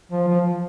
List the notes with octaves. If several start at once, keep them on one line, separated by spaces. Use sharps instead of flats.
F3
F3